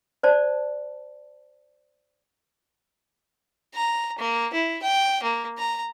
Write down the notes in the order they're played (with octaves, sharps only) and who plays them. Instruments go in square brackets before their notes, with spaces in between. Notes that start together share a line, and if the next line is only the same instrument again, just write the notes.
[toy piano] C5 D5 A5
[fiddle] A#5
A#3
E4
G5
A#3
A#5